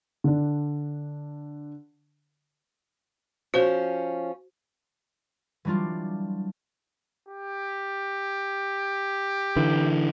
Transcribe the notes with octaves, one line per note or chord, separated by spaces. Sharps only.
D3 D4
F3 C#4 F#4 C5
E3 F#3 G3 D4 F4
G4
D3 E3